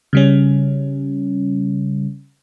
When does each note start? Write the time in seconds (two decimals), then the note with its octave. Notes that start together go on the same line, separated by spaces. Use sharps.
0.13 C#3 G3 C#4